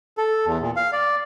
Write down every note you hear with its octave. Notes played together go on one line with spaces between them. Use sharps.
A4
E2
A#2
F5
D5